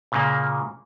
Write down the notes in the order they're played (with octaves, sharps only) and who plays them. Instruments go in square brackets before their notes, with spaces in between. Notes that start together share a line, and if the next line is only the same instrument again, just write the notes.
[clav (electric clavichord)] A#2 C#3 A#3